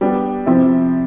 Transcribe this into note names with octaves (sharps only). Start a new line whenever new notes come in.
G3 B3 D4 G4
C3 F3 C4 E4